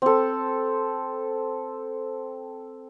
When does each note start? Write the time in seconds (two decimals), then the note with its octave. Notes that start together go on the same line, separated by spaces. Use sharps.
0.02 C4 A4